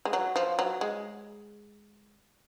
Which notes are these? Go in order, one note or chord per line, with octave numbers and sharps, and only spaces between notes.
G#3
F#3
F3
F#3
G#3